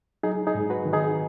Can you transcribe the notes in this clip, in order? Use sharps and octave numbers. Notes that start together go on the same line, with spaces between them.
F#3 D#4 G#4
D#4 G#4
G#2
F#4 B4
D#3
D#4 G#4